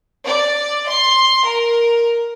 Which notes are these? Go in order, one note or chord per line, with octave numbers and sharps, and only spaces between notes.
D5
C6
A#4